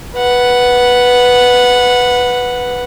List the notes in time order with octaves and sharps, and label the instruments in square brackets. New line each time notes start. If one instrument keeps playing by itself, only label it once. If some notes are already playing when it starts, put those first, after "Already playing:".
[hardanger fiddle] B4 F#5